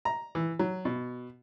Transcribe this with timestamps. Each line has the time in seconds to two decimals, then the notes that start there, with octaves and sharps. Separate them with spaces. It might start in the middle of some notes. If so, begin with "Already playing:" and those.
0.05 A#5
0.35 E3
0.59 F#3
0.85 B2